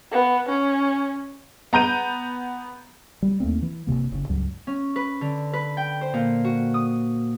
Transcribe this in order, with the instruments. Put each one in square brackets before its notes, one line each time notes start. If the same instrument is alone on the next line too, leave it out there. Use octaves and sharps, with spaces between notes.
[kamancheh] B3
C#4
[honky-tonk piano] B3 A#5 G6 D#7
[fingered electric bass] G3
D#2 A3 A#3 C4
E3
G1 F#2 C3 A#3
F#1 C#3
C#2 G2 F#3
[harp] C#4
B4
D3
B4
G5
C5
A#2
F#4
D#6